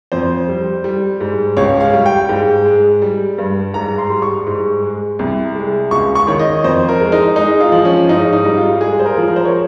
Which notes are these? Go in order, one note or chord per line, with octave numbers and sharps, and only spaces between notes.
F2 C5
G3
G3
G#2
C#2 C#5
F5
G3
G5
G#2
G#3
G3
G2
G#2 A#5
C6
G3
C#6
G#2
G#3
C2
G#3
C#2 C#6
C#6
D#3 C#5
D#5
F2 C5
A#4
G#3
D#4
G#3 D#4
F4
F3
C#4
G#2 D#4
D#4
G3
F4
G#3 G#4
C5
A#4
F3
A#4
C5
C#5